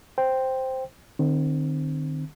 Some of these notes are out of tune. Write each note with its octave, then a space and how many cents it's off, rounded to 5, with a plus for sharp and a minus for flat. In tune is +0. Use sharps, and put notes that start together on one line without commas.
C5 +0 G5 +0
D#3 -40 C4 +0